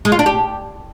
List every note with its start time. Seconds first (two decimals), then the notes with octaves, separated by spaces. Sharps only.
0.05 G#3
0.12 F4
0.19 D4
0.26 G4